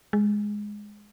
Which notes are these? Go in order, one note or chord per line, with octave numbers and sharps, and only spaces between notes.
G#3